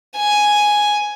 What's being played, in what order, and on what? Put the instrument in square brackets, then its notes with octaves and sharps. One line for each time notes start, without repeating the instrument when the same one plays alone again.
[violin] G#5